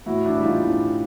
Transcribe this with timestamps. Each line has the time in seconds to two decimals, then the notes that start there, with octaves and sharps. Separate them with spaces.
0.06 A2 E4 F#4
0.26 D4 E4
0.35 E3 G3
0.44 D#4 F4
0.64 A2 D4 E4